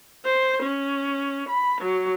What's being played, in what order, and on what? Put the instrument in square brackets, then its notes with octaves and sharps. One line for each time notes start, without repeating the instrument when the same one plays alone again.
[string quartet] C5
C#4
B5
F#3